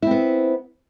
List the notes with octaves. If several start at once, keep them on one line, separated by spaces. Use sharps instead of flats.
B3 C4 E4